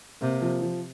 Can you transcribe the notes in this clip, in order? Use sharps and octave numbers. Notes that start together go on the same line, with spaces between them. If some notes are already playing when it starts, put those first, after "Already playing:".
C3 A#3
F3
F3